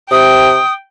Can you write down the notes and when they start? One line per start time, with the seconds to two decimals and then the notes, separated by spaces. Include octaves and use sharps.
0.11 C3 G5 D#6